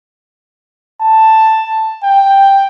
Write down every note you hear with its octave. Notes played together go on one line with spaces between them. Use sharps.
A5
G5